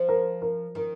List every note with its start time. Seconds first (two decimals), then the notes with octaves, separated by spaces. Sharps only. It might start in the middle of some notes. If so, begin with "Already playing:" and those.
Already playing: F3
0.09 A#4
0.42 A#4
0.75 D#3 A#4